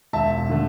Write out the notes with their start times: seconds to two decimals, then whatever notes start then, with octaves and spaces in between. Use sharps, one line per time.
0.13 E1 E5 A5
0.49 D3 A3